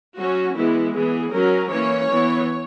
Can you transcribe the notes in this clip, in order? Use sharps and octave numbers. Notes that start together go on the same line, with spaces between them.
F#3 C#4 F#4
E3 G#3 B3 E4
E3 B3 G#4
F#3 C#4 A#4
E3 A#3 C#4 C#5
E3 B3